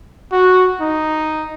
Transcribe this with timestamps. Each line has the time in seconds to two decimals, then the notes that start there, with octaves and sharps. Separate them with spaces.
0.32 F#4
0.81 D#4